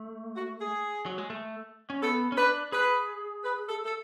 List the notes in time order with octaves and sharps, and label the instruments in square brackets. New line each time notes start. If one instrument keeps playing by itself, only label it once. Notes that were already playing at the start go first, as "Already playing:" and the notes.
Already playing: [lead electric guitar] A3
[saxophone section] F#4
G#4
[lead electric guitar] F#3
G#3
A3
C#4
[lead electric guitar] B3 [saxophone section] A4
[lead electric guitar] C#4
[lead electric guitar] D4 [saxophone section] B4
[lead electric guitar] G#4 [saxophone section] B4
[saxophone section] B4
A4
A4